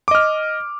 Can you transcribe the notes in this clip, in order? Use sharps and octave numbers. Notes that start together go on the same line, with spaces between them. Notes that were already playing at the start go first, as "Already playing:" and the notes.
D#5 D6 F6